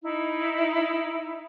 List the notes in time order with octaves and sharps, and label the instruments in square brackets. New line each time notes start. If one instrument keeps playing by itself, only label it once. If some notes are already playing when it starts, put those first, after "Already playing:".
[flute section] D#4 E4